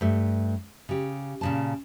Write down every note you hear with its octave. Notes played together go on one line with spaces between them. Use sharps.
G2 A3
C#3 G4
A#2 C#3 A5